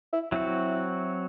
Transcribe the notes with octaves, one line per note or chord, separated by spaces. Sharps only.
E4
F#3 C4 E4 F#4